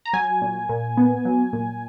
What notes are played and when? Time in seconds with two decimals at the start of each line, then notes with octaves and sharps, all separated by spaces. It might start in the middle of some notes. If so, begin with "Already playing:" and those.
0.05 A#5
0.13 F#3 G#5
0.42 A#2
0.69 A#2
0.97 B3
1.25 F#3
1.53 A#2